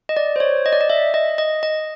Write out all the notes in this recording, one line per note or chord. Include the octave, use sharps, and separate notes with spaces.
D#5
D5
C5
C#5
D#5
D5
D#5
E5
D#5
D#5
D#5